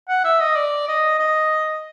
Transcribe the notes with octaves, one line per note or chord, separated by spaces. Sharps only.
F#5
E5
D#5
D5
D#5
D#5